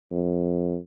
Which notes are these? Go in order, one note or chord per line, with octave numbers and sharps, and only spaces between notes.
F2